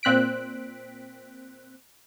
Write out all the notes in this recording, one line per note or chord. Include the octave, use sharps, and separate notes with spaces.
A#2 C4 F#6 B6 D7